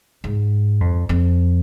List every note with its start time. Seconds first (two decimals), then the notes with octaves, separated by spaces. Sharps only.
0.24 G#2
0.81 F2
1.09 F2